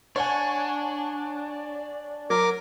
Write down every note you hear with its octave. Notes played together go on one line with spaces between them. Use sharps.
D4 C#5 F#5 G#5
F#3 A#4 D6